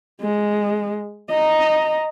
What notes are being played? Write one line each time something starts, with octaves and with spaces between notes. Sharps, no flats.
G#3
D#5 A#5